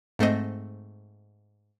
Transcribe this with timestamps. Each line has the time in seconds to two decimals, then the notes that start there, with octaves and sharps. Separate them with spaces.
0.19 G#2 A3 C4 D#5